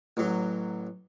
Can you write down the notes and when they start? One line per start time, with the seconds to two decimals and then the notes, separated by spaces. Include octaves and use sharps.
0.17 A1 F#3